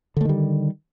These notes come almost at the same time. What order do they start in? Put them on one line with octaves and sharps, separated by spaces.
D3 A3 D#3 G3